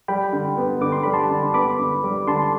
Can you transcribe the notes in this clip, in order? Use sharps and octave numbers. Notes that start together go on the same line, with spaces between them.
G3 G5 B5
D3
B3
D3 D6
C6
G3 B5
A5 C6
D3
B3 B5 D6
D3
G3
D3 A5 C6